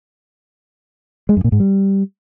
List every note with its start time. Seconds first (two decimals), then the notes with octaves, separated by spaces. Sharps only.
1.29 G#3
1.37 F#2
1.44 A#2
1.52 G#2
1.60 G3